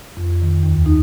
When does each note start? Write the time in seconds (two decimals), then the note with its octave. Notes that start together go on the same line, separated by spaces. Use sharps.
0.17 F2
0.42 D#3
0.63 D#2
0.86 D#4